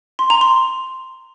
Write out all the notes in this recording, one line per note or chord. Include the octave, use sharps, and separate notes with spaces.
C6
A#5
C6